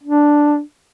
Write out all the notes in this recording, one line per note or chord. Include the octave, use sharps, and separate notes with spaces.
D4